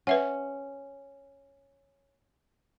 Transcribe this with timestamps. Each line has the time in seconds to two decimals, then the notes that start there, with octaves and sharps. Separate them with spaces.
0.07 C#4 B4 E5 F#5